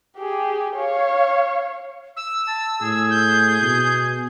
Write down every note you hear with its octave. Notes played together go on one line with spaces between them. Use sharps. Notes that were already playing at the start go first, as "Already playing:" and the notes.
G4 G#4
C#5 F5
E6
A5
A2 G#4
G6
B2